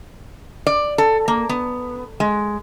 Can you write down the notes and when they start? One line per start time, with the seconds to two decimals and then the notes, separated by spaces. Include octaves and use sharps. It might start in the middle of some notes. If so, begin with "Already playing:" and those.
0.67 D5
0.98 A4
1.28 A#3
1.49 B3
2.20 G#3